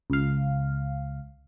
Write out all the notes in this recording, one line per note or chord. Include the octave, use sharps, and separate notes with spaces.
C#2 F5